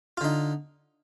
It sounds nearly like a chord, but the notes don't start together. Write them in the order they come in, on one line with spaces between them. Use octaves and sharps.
F4 D3 D#4